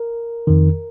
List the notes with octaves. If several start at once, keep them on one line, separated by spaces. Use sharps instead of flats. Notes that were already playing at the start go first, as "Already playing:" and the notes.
Already playing: A#4
F2 D#3